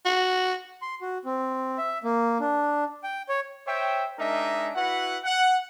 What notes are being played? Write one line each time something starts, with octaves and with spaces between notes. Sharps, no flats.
F#4
C6
F#4
C4
E5
A#3
D4
G5
C#5
C5 C#5 E5 G5
G#3 D4 D#4 A#4 E5
E4 F#4 B4 F#5
F#5